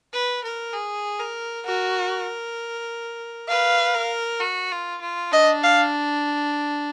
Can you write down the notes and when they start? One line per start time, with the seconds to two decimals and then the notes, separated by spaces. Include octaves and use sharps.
0.13 B4
0.44 A#4
0.73 G#4
1.20 A#4
1.66 F#4 A#4
3.48 B4 F5
3.95 A#4
4.40 F#4
4.72 F4
5.01 F4
5.32 D4 D#5
5.63 F5